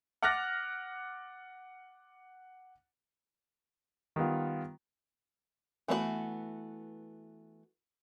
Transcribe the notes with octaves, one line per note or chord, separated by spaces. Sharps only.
F#5 D6 F6 F#6 A6 A#6
D#3 G3 B3 F4
E3 A3 B3 D4 F#4